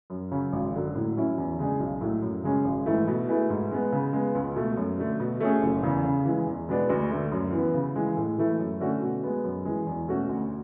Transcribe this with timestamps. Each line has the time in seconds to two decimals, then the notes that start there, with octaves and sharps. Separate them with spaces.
0.10 F#2
0.31 C#3 F#3 C#4
0.52 G#1
0.74 F#2 D3 F#3
0.95 A2
1.16 F#3 C#4 E4
1.38 E2
1.59 C#3 G#3 D4 G#4
1.79 B1
2.01 A2 F#3 A3
2.22 F#2
2.44 C#3 G#3 C#4
2.65 G#1
2.86 G#2 E3 A3 E4
3.07 B2
3.28 A3 E4 G#4 B4
3.50 G#2
3.71 G#3 B3
3.92 C#3
4.13 G#3 B3
4.35 C#2
4.56 B2 A3
4.77 F#2
4.98 D3 A3
5.20 B2
5.41 A3 C#4 G#4
5.62 F#1
5.83 E2 C#3
6.04 C#3
6.25 E3 G#3
6.47 E2
6.69 B2 G#3 B3 D4
6.89 D2
7.11 D3 A3
7.32 F#2
7.53 E3 B3
7.74 C#3
7.96 E3 G#3
8.17 A2
8.38 E3 A3 E4
8.59 F#2
8.80 D3 A3 C#4 F#4
9.02 B2
9.23 G#3 B3
9.44 F#2
9.65 E3 G#3
9.86 E2
10.08 B2 A3 C#4 F#4
10.29 D2